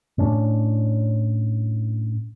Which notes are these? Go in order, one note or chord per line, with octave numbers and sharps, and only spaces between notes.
A2 C#4 D4